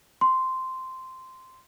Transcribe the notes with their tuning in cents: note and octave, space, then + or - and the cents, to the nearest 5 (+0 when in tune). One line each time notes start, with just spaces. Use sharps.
C6 -10